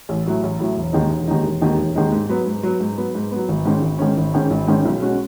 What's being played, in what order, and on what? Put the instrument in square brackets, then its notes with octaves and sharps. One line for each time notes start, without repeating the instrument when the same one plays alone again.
[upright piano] A1
A2 F#3 A3
A1
A2 F#3 A3
E1
D#2 D#3 G#3 D#4
E1
D#2 D#3 G#3 D#4
E1
D#2 D#3 G#3 D#4
E1
D#2 D#3 G#3 D#4
G#2
F#3 B3
G#2
F#3 B3
G#2
F#3 B3
G#2
B3
F#3
G#1
G#2 D#3 G#3 C#4
G#1
G#2 D#3 G#3 C#4
G#1
G#2 D#3 G#3 C#4
G#1
G#2 D#3 G#3 C#4
B1
B2 G#3 C#4 F#4